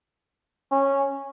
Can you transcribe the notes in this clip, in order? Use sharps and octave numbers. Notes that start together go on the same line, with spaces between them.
C#4